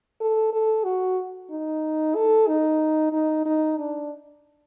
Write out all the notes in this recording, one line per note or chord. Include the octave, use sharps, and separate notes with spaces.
A4
A4
F#4
D#4
A4
D#4
D#4
D#4
D4